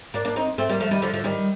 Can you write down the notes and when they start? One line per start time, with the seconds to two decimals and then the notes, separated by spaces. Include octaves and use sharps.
0.14 A#3 D4
0.25 A#3 D4
0.36 C4 D#4
0.58 A3 C4
0.69 G3 A#3
0.80 F3 A3
0.91 D#3 G3
1.02 D3 F3
1.14 D3 F3
1.24 D#3 G3